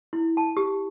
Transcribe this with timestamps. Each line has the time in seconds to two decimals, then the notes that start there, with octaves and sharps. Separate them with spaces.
0.13 E4
0.37 A5
0.57 G4